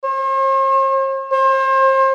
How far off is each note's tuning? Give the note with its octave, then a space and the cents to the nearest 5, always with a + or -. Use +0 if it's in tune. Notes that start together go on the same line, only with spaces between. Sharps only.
C5 +45
C5 +35